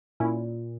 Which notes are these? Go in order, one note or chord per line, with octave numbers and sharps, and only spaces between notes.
A#2 C#4 E4